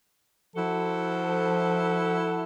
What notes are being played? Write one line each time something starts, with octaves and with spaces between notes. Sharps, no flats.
F3 E4 F#4 A4